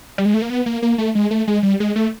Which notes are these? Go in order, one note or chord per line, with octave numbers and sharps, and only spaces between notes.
G3
G#3
A3
A#3
B3
A#3
A#3
A3
G#3
A3
G#3
G3
G#3
A3